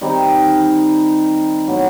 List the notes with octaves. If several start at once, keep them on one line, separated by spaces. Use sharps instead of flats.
D#3 G3 C4 D#4
A2 F#3 B3